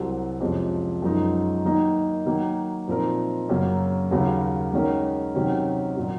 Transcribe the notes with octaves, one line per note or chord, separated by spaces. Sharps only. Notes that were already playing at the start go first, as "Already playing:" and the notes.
Already playing: C2 C3 F#3 C4
F2 C3 F3 G#3 C#4
F#2 F3 G#3 D#4 F#4
D#3 F#3 A#3 D#4
D#3 F#3 A#3
A#2 F3 C4 D#4 A#4
F#2 C#3 F#3 A#3 C#4
D#2 C#3 F#3 C#4
D#3 G#3 C#4 F#4 A#4
C3 D#3 F#3 C#4 F#4
A#2 F#3